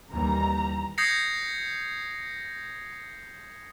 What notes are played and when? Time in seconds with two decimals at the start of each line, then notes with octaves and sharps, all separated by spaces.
0.12 D#2 E3 G3 A#5
0.98 D#6 G6 G#6 A#6 C7 C#7